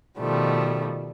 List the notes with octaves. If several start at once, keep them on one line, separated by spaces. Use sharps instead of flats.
B2 D#3 F3 G3 A3